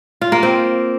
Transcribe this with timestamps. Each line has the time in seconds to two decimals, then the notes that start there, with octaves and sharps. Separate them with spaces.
0.21 F4
0.32 A#3
0.43 C4